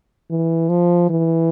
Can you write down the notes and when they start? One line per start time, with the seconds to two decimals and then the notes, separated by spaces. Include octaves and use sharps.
0.31 E3
0.69 F3
1.10 E3